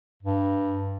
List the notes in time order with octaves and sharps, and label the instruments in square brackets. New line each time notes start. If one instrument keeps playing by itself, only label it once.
[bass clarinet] G2